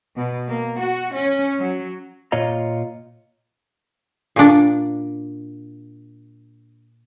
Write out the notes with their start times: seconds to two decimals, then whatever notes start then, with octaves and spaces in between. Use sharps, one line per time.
0.16 B2
0.49 A#3
0.80 F#4
1.14 C#4
1.59 F#3
2.32 A#2 F4 C#5 D#5 A#5
4.36 A#2 D4